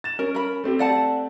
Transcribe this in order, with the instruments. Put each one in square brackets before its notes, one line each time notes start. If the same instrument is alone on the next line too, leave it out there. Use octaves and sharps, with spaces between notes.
[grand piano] A6 E7
[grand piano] C#4 [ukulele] A#4
[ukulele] A#4 B5
[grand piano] A3 C4 G4
[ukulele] D5 F#5 A5